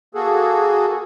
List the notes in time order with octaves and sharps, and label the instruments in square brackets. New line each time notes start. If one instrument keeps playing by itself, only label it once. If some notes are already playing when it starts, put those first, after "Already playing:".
[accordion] A#3 F#4 G#4 A4